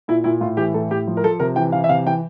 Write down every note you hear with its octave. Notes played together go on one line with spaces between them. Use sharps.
A#2 E4
A#2 E4
A2 F4
E3 G4
A2 A4
A2 G4
F3
A#4
F3 A4
C3 A#4
E3 G5
E3 F5
E5
C3 F5
E3 G5